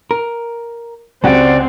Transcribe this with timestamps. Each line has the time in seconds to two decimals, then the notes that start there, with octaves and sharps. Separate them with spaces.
0.11 A#4
1.24 C#2 C#3 C4 F#4 G4 D5 F#5 D7